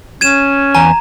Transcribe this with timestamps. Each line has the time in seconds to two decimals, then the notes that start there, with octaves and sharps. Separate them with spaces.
0.21 C#4 G#6 D#7 E7
0.75 E2 G#5 A#5